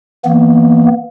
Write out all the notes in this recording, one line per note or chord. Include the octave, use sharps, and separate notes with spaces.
E3 A#3 B3